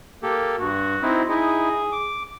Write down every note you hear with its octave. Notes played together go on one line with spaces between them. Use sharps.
A#3 G4 A4
G2 F#4
C4 D#4 E4
D#4 E4 G#4
D6